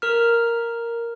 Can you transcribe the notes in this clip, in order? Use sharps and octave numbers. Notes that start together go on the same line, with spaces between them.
A#4 F6